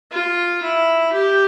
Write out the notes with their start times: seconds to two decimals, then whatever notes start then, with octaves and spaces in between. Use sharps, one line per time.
0.11 F4
0.63 E4
1.13 G4